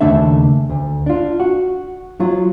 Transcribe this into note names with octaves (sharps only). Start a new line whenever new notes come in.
D#2 C#3 A3 D4 E5
D2
D4 F4
F#4
F#3 F4